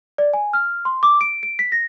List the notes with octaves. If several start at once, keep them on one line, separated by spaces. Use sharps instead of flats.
D5
G#5
F6
C6
D6
D7
D7
B6
A#6